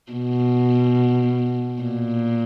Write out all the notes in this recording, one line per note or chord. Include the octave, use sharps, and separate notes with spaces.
B2
A#2